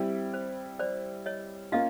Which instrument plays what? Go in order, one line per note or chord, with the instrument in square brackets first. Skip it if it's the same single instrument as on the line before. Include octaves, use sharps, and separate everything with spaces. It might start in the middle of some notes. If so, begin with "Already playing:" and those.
Already playing: [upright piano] G3 C4 E4 G4
[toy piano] C5
C5 D5
C#5 D#5
[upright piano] A#3 C#4 F4 [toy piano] D#5 F5